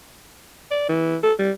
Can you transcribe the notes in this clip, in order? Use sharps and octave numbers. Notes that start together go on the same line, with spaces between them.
D5
E3
A4
G3